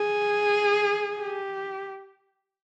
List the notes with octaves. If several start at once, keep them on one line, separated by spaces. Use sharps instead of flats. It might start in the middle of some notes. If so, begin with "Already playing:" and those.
Already playing: G#4
G4